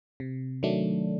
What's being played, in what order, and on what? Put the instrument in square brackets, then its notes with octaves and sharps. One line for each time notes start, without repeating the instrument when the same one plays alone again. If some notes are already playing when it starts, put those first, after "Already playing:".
[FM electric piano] C3
D#3 F#3 A3 D4